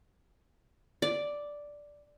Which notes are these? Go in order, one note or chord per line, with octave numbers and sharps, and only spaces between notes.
D5